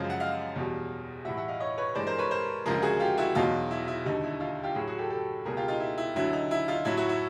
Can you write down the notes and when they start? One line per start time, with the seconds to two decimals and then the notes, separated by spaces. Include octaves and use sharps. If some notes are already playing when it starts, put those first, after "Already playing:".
Already playing: F#2 C#3 F3 G#3
0.10 F#5
0.20 D#5 F5
0.56 E2 B2 G3
1.25 A2 E3 G3 E5 F#5
1.37 E5 F#5
1.48 D#5 F5
1.60 C#5 D#5
1.78 B4 C#5
1.95 G2 E3 G#3 C5 D5
2.07 A#4 C5
2.18 B4 C#5
2.31 A#4 C5
2.66 D2 C#3 F3 G#3 G#4 A#4
2.82 F#4 G#4
3.00 F4 G4
3.18 E4 F#4
3.35 E2 B2 F#3 D#4 F4
3.71 E4
3.88 E4
4.05 D#2 D3 G3 D#4
4.23 E4
4.40 D#4 F4
4.63 F4 G4
4.75 A2 F#3 F#4 G#4
4.87 F#4 G#4
4.98 G4 A4
5.10 G4 A4
5.45 C#2 B2 G3 G#4 A#4
5.57 F4 G4
5.68 D#4 F4
5.80 E4
5.98 E4
6.16 D2 D3 F#3 E4
6.33 D#4
6.51 E4
6.68 D#4 F4
6.85 A2 F#3 E4
6.97 E4 F#4
7.09 E4